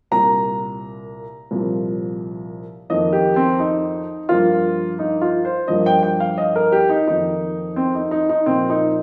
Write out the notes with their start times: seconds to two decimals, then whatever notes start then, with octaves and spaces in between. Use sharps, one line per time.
0.11 C2 A#2 A#3 A#5
1.51 C2 A#2 F3
2.90 F2 D#3 A#3 D#5
3.13 G4
3.36 C4
3.59 D#4
4.29 G2 F3 A#3 F4
4.99 D#4
5.21 F4
5.45 C5
5.68 G2 F3 A#3 D#5
5.86 G5
6.03 G5
6.20 F5
6.38 D#5
6.56 A#4
6.72 G4
6.89 D#4
7.07 F2 D#3 A#3 D#4
7.76 C4
7.95 D#4
8.11 D#4
8.29 D#4
8.46 A#2 F3 A#3 C4
8.70 D#4